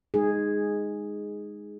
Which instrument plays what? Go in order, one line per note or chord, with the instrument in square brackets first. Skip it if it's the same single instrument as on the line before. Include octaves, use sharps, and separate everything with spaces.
[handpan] G#3 D#4 G#4